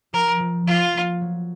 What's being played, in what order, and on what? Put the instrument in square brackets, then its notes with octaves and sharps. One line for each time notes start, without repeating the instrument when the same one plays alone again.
[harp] F3 [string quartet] A#4
[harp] F3
[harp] F3 [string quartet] F4
[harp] A#3
F#3